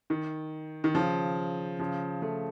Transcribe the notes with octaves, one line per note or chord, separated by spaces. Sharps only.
D#3
D#3
C#3 F3
C#3 F3
F3 A3